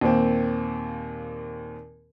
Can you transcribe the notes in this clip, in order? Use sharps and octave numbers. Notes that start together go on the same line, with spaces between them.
D#2 A#2 C4